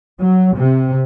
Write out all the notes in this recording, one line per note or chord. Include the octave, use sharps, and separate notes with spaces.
F#3
C3